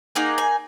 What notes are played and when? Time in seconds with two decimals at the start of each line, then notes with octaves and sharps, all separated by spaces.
0.15 A#3 D#4 G#4 F#5
0.38 G#5